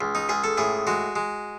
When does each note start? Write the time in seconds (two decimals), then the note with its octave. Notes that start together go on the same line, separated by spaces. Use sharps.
0.01 C#2
0.15 D#4
0.29 C#2 G#4
0.44 A4
0.58 A2 G#4
0.87 G#3 F#4
1.16 G#3